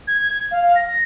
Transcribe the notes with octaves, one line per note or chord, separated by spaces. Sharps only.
G#6
F5
A#6